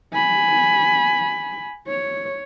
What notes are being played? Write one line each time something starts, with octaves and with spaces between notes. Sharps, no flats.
G#5 B5
C#5